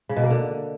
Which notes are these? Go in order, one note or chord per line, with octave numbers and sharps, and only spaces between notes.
C#3
B2
A#3
D3